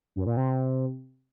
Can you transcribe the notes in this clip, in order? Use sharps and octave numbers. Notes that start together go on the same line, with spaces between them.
F#2
A#2
C3